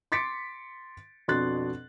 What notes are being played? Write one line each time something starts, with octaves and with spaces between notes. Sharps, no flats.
C6 D6 A6 B6 C#7 D7
F2 B2 D4 C6 F#6 A6